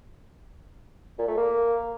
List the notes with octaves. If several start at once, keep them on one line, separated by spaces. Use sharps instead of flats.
A#2
A3
A#3